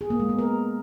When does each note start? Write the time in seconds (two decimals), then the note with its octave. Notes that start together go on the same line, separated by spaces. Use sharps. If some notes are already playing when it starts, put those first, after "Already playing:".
0.01 G#4
0.10 A#3
0.20 G#3
0.29 B3
0.39 A#4